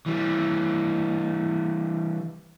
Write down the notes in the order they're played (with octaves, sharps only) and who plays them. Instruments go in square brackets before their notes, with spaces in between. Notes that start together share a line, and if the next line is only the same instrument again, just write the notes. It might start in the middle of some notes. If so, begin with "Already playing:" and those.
[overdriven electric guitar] E3 G3